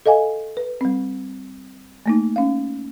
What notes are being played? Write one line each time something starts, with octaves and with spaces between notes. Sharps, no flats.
A4 D#5 F5 G#5
B4
G3 C4
A3 A#3 D#4
C#4 F5